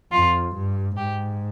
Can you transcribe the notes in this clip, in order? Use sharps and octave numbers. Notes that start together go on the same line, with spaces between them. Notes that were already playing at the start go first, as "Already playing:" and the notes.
F2 F4
G2
G#2 G4